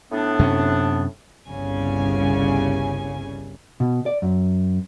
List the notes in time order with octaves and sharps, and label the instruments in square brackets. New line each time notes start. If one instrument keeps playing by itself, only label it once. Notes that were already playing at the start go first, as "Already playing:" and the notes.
[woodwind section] A2 B3 D4
[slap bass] F#2 C3 C#4
[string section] G1 C2 C#3 G#5
[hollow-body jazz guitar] B2
D5
F#2